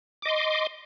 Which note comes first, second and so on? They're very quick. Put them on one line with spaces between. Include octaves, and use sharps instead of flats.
D6 D#5 C6